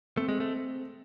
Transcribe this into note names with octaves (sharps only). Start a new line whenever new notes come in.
A3 C4
G#3
A3